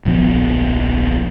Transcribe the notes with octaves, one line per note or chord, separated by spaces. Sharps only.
D1 A#1 F3 B3